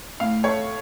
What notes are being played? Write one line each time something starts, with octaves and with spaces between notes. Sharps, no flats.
A2 F5
A3 C#5